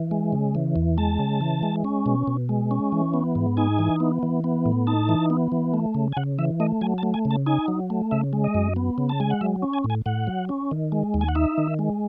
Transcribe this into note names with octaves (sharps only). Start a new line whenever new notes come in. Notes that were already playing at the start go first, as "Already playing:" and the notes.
Already playing: E3
G#3
C#3
E3
E2
G#3 A5
C#3
E3
G#3
C#4
B2
B2
G#3
C#4
E3
B3
G#2
D#4 G#5
E3
B3
E3
B3
A2
D#4 A5
E3
B3
E3
A3
C#3
G#5
C#3 F#5
E3 E5
A3 D#5
F#3 G#5
A5
A3
G#5
C#3
A5
D#4 G#5
F#3
A3
C#3 E5
G#3
D#5
F#2
B3
C#3
A5
G#3 G#5
F#5
F#3 E5
C#4
G#5
A2
G#5
A2 F#5
F#3
C#4
D#3
G#3
D#2
G#5
F#5
D#4 E5
D#3
G#3